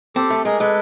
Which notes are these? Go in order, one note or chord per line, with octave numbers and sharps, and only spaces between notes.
C4 G4 A4
A3
G#3 G#4 A#4
G#3 A4 B4